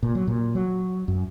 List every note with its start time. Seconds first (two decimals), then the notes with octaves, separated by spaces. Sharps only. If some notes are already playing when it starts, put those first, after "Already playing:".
0.03 A#2
0.15 F#3
0.27 A#2
0.55 F#3
1.08 F#2